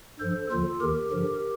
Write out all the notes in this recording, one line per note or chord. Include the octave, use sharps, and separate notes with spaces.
G2 F3 A4 C5
D#2 D3 F3 F4 A4
D#2 D#3 G4 A#4
G2 D3 F3